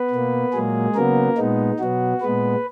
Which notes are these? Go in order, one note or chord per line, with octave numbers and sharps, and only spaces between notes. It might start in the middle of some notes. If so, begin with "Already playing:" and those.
Already playing: B3 B4
B2 A#3
A#2 F#3 G#3 A#3 G#4
C#3 F#3 A#3 B3 A#4
A#2 G#3 B3 D#4
B2 F#3 B3 F#4
A#2 G#3 B3 B4